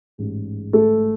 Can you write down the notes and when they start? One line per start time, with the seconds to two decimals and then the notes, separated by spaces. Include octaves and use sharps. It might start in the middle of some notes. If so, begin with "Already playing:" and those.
0.18 A1 G#2 G#3
0.73 A3 A4